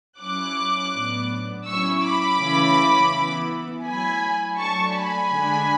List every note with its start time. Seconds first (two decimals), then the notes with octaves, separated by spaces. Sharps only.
0.20 F#3 C#4 E4 D6 F#6
0.93 A2 F#3 B3 D4
1.66 F#3 C#4 E4 C#6 E6
2.03 B5 D6
2.38 C#3 E3 A3 C#4 E4
3.12 E3 B3 E4
3.85 F#3 A3 E4 G#5 B5
4.57 F#3 A3 D4 A5 C#6
4.94 G#5 B5
5.30 D3 G#3 D4